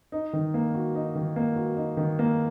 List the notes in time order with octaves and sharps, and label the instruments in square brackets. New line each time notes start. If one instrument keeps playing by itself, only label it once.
[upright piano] D#4
D#3
A#3
F#4
D#4
D#3
A#3
F#4
D#4
D#3
A#3